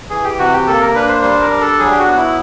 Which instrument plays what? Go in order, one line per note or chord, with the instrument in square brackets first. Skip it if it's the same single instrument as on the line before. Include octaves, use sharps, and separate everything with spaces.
[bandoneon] E3 [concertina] G#4
[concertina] G4
[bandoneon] C3 [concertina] F#4
[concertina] G4
[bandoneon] A#3 [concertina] A4
[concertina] A#4
[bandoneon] D4 [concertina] B4
[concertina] C5
[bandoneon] G3 [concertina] C5
[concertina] A#4
[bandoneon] D4
[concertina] A4
[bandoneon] F#3 [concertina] G#4
[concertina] G4
F#4
[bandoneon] B3
[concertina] E4